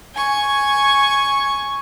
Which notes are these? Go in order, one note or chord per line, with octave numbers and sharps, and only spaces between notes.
G#5 C#6